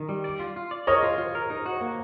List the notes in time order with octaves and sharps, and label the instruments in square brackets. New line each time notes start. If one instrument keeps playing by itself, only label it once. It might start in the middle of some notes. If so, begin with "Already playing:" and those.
Already playing: [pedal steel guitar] D#3
G3
D5
F4
F4
D5
[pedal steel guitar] A#4 [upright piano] C#5 D#5
[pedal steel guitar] F4
F4
A#4
D#4
F#4
A#3